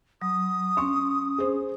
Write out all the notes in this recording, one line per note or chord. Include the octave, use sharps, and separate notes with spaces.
F#3 D#6
C#4 C6 C#6
G#4 C5